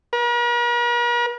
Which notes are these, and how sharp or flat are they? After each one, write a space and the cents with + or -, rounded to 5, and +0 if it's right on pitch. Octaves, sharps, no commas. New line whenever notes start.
A#4 +45